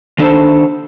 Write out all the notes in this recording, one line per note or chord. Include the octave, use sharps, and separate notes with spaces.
D#3 D4 A4 C5